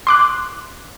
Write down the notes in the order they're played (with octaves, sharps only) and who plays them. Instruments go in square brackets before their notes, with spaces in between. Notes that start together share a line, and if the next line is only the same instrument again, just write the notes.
[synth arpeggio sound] C6 D6 F#6